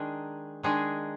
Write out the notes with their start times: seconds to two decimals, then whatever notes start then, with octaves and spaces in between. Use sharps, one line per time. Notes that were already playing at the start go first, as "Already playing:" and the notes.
Already playing: D#3 G#3 D4 G#4
0.63 D#3 G#3 D4 G#4